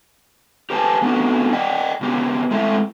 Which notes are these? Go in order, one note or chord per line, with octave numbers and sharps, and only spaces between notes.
G4 B4 C5 F5 G#5 A5
A3 B3 C4 D4 D#4 F#4
D5 D#5 G5
A#2 C#3 B3 G4
G#3 A3 C4 E4 E5